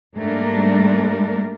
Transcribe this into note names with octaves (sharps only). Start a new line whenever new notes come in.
G#2 G3 A3 A#3 D4 A#4